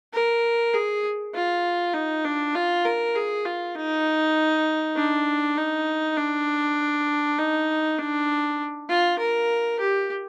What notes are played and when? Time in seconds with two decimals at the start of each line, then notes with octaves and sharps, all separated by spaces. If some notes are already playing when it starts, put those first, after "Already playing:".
0.14 A#4
0.74 G#4
1.35 F4
1.94 D#4
2.25 D4
2.56 F4
2.85 A#4
3.16 G#4
3.46 F4
3.76 D#4
4.96 D4
5.58 D#4
6.17 D4
7.39 D#4
7.98 D4
8.89 F4
9.19 A#4
9.80 G4